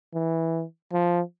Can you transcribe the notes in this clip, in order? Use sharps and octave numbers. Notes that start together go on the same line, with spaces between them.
E3
F3